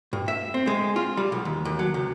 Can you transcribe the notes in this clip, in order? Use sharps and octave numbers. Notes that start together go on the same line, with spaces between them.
G2
E5
C4
G#3
F4
G3
B1
D#2
D#2
F#3
C#2